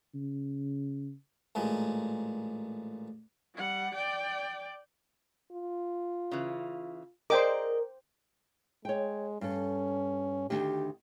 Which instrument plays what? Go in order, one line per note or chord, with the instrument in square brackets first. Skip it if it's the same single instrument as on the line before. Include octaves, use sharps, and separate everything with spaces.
[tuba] C#3
[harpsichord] A1 A#2 G#3
[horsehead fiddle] G3 F#5
D5 G5
[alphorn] F4
[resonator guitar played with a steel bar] C#3 E3
[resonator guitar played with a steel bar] G#4 D5 D#5 [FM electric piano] A#4 [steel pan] C5 G5 D6
[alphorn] G#3 [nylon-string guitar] C#5 G5
[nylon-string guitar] G2 A4 [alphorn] C#4
[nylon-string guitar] D2 D#3 D4 [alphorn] G4